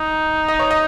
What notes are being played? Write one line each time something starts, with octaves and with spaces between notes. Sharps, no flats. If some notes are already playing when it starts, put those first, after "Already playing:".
Already playing: D#4
D#5
C#5
D#5